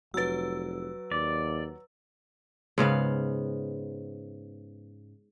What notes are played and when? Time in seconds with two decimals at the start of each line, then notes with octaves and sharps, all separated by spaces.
0.14 F1 F#3 B4 E6 A6
1.12 D#2 D5
2.78 G#2 C#3 B3 F5